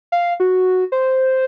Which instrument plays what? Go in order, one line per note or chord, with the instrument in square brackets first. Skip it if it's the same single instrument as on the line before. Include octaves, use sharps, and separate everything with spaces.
[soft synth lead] F5
F#4
C5